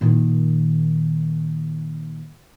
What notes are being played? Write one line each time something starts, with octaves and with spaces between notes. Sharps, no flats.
A#2 D#3